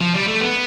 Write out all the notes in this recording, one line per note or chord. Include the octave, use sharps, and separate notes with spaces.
F3
G3
A3
B3